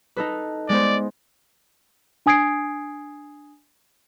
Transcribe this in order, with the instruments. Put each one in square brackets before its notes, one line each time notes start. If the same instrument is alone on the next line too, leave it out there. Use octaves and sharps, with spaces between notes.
[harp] D#4 A4 B4
[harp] G#3 B3 C5 [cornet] D5
[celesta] D4 G#5 D#6 G#6 C7 D7